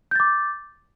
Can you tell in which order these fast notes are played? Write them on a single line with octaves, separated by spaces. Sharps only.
G6 A6 D6